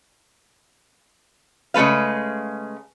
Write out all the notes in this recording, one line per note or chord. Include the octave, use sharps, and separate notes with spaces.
C#3 G#3 A3 B4 F5